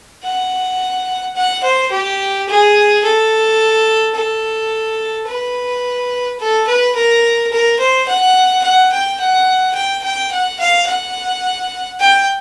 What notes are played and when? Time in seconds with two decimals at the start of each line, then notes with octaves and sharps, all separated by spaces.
0.24 F#5
1.36 F#5
1.64 C5
1.91 G4
2.48 G#4
3.04 A4
4.15 A4
5.27 B4
6.39 A4
6.68 B4
6.95 A#4
7.52 A#4
7.79 C5
8.08 F#5
8.64 F#5
8.92 G5
9.20 F#5
9.75 G5
10.03 G5
10.32 F#5
10.60 F5
10.87 F#5
12.00 G5